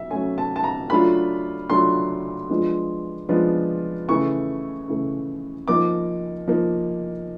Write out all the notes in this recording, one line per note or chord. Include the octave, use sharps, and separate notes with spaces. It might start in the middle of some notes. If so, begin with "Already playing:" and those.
Already playing: F#3 E5
F#3 A3 C#4 G#5
A5
A5
A#5
F#3 A3 D4 F4 B5
F#3 A3 D4 F4 C6
F3 G#3 B3 D4 F4
F3 G#3 B3 D4 F4
C#3 E3 A3 C#6
C#3 E3 A3
F3 A#3 D#4 D6
F3 A#3 D#4